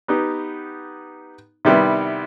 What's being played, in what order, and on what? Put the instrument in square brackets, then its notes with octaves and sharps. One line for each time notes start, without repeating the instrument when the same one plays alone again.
[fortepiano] B3 D#4 G4
C3 D#3 G3 B3 E4